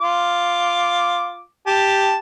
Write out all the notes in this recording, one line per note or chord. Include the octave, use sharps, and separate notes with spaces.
F4 D6
G4 A5